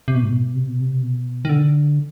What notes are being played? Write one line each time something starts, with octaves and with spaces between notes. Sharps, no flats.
C3
B2
G#2
B2
C3
B2
C3
B2
D#3
D3